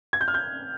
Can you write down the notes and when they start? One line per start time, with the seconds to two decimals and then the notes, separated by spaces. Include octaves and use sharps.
0.13 G#6
0.21 G6
0.28 F6
0.34 G6